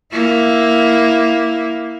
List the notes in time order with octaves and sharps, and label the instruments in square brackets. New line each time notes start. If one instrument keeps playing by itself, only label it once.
[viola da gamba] A#3 E4